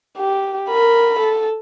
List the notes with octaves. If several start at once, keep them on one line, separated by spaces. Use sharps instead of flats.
G4
A#4 B5
A4